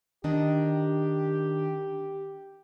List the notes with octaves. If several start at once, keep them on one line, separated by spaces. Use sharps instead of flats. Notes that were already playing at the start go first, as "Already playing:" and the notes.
D#3 D4 G4 D#5